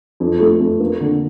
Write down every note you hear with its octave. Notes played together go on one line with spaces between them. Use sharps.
F2
A3
F2
A#3
D3